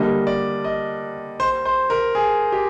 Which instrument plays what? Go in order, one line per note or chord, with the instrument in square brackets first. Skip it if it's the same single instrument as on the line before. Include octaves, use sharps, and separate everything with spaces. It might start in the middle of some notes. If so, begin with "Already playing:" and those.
Already playing: [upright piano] D3 G3 A#3 [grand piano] D#5
[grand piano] D5
D#5
C5
C5
A#4
G#4
G4